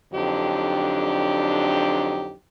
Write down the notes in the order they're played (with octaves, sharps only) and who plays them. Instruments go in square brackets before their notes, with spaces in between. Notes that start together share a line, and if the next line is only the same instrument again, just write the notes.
[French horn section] F2 D3 F#3 D4 D#4 G4